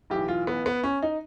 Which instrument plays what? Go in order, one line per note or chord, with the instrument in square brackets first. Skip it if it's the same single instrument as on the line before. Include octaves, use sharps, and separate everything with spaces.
[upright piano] B1 A2 E3 G4
F4
B3
B3
C#4
D#4